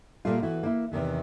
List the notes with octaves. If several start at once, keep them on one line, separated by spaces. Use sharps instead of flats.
A#2 G3 A3 F4
E3 B3 E4 F#4
A#3 E4
E2 C3 D#3 E3